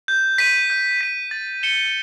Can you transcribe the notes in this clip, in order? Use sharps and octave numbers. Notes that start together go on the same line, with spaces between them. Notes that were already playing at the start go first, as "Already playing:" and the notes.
G6
B6 D#7
G6
B6 D#7
A6
C#7 E7 G7